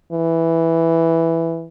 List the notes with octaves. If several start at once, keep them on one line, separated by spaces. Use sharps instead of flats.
E3